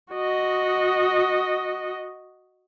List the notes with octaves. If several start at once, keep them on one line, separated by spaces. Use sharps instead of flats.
F#4 D#5